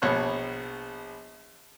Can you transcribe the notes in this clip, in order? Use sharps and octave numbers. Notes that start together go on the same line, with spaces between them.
A#1 B2 C#5 F#6